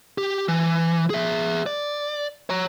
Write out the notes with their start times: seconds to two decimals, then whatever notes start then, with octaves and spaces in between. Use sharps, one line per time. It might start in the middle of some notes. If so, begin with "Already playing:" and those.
0.18 G4
0.48 E3
1.10 G#4 E5
1.66 D5
2.50 C#5 A#5